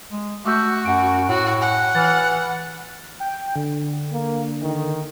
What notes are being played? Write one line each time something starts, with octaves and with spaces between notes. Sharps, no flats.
G#3
A3 F#4 D6 E6 G6
F#2 F#5 D7
A2 F#4
F#5 G#5
E3 F6 A6
G5
D3
A#3
D#3